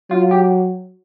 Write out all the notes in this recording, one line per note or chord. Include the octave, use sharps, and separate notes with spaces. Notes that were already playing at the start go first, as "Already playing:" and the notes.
F#3 F4
G4